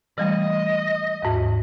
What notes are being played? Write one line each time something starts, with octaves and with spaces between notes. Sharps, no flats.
E3 G3 A3 D#5
D#2 G#2